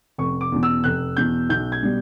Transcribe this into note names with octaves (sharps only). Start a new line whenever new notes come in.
F1 C#6
D6
E2 B2
E6
F1 F#6
E2 B2 G6
B1 G6
G#6
B2 G3